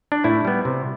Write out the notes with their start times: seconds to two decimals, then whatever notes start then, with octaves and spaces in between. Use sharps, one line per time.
0.12 D4
0.24 A2 E4
0.45 G3 B3
0.65 C3